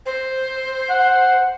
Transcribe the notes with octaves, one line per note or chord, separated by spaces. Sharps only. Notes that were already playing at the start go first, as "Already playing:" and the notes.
C5
F#5